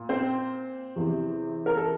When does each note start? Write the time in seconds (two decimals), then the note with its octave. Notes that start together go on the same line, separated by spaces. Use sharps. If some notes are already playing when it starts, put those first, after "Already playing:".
Already playing: A#2
0.09 C4 C5
0.96 E2 C3 E3
1.66 A#4
1.76 A4